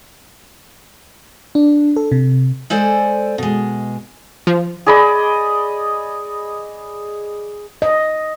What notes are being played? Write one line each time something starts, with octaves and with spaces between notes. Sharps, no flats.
D4
A4
C3
G#3 A4 C5 D5 G#5
B2 G#3
F3
G#4 D5 D#5 B5
D#5